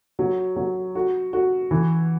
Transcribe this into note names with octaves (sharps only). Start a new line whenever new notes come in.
F#3
F#3
F#4
F#4
E3